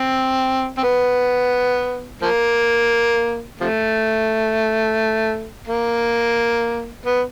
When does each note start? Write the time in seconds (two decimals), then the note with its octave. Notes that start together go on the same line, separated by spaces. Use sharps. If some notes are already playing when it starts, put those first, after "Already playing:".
Already playing: C4
0.77 C4
0.83 B3
2.22 F3 A#3
3.60 C3 F3 A3
5.68 A#3
7.06 B3